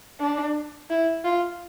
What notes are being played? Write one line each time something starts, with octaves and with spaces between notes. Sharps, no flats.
D4
E4
F4